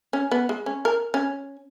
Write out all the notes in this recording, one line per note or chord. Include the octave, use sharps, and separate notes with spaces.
C#4
B3
G#3
C#4
A#4
C#4